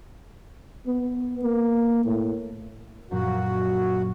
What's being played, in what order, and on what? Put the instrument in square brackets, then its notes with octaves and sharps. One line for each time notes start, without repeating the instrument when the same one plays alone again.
[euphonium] B3
A#3
A2
[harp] F#2 A#2 F#3 [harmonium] F#4